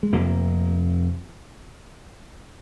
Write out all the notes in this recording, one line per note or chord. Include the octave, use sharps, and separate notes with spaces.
G#3
F1 F2 C3 A#3